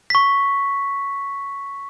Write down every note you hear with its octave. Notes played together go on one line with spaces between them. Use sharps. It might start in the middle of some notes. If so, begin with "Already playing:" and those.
C#6 B6